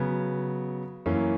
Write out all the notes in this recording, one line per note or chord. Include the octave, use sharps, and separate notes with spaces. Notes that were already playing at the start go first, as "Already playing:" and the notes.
Already playing: C#3 F#3 B3
F#2 E3 A#3 C#4